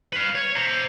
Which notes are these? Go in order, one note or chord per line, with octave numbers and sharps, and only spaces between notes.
B4 F5
C#5
C5 A#5